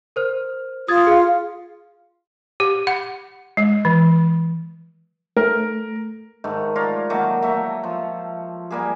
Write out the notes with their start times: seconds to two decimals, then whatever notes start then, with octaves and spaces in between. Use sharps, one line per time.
0.16 A#4 C5 F6
0.88 F4 D#6 G#6 A6
1.07 G#4 F5
2.60 G4
2.87 F#5
3.57 G#3
3.85 E3
5.37 A3 A#4
6.44 G#2 D#3 A3
6.76 F4 A#4 C#5 D5
7.10 D#3 F#3 A3 A#3
7.43 A3 E5 A#5
7.84 F3
8.71 G3 A#3 G#4